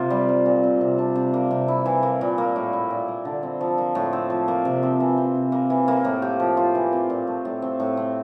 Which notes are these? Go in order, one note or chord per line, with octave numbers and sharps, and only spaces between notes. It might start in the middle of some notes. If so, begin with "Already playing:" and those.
Already playing: C3 A#3 F4
G3
C4
A#2
C4
C3
D4
C3
A#3
C3
E4
E3
A#3
A#2
A#3
A2
E4
A#2
A#3
D3
C4
F3
A#3
A2
C4
F3
A#3
C3
C4
E3
C4
C3
A#3
E3
A#3
A2
G4
F3
F4
E3
C4
A#2
A3
A2
C4
A2
C4